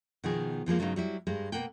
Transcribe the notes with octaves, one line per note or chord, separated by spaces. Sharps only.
B2 D#3 F3 G#4
E3 F3 G#3 A#3
G2 C#3 F#3 B3 D#4
F#3 G3 E4
G2 G3 G#3
B2 A#3 F#5 G5